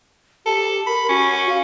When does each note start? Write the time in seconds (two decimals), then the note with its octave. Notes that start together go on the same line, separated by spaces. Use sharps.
0.46 G4 A4
0.87 A#4 B5
1.09 C#4 F#4
1.49 F5